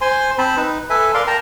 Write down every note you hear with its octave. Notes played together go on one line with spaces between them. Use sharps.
C5 G#5 C6
C4 C5 A5 B5
D#4 B4
A4 B4 E5 G#5
A#4 D5 F5 C6
A#4 G5 A5 A#5